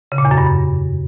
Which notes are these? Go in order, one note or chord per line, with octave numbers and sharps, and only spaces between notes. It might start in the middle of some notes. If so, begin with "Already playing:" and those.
C#3
A#2
E2
F#2
G2